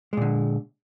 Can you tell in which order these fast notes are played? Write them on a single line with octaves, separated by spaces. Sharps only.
G#3 A#2 D3